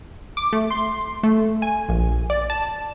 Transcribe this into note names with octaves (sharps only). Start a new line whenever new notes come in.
D6
A3
C6
A3
G#5
A#1
D5
A5